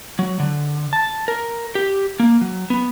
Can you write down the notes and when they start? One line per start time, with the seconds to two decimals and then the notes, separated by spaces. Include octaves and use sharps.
0.19 F#3
0.40 D3
0.93 A5
1.28 A#4
1.75 G4
2.20 A#3
2.41 F#3
2.70 B3